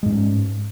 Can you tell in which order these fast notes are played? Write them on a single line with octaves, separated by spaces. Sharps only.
G#3 G#2 C#4